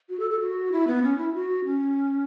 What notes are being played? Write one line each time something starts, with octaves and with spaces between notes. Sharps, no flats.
F#4
A4
A4
F#4
E4
B3
C#4
E4
F#4
C#4